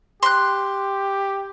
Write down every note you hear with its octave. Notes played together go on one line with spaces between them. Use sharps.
G4 C6 F#6